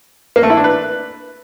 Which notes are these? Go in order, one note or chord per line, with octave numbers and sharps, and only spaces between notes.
A#3
A3
E4
D4
B4